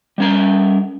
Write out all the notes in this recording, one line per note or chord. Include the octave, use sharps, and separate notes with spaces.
G3 C#4 A#5